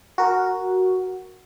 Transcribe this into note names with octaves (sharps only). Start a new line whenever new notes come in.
F#4 A#4